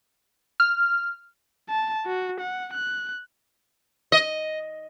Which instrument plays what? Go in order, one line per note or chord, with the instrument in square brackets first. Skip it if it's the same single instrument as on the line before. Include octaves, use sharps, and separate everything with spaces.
[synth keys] F6
[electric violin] A5
F#4
F#5
F#6
[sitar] D#5